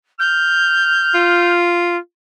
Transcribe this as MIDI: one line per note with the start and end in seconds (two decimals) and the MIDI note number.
0.19 1.72 89
0.19 1.51 91
1.14 1.98 65